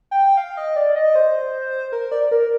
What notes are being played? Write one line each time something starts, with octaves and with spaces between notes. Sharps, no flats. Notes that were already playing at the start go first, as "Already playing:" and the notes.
G5
F5
D#5
D5
D#5
C5
A#4
D5
A#4